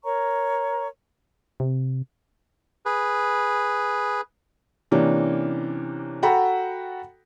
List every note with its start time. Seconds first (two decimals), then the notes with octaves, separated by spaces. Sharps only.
0.04 A#4 C#5 A#5 C#6
1.60 C3
2.86 G#4 B4
4.91 C3 E3 A#3 C#4 D4
6.23 F#4 A4 F#5 G5 A#5 B5